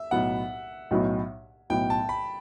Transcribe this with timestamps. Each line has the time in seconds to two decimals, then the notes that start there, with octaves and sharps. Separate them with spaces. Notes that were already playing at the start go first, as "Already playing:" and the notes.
Already playing: E5
0.11 B1 A2 F#3 B3 F#5
0.91 B1 A2 F#3 B3
1.70 B1 A2 F#3 B3 G5
1.90 A5
2.09 B5